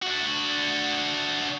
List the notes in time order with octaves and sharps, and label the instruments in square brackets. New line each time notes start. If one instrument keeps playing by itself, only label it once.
[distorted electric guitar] D4 F#4